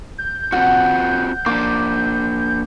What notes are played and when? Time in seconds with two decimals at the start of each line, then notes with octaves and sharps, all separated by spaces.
0.18 G6
0.52 C4 F4 F#4 F#5
1.46 A#3 D4 D6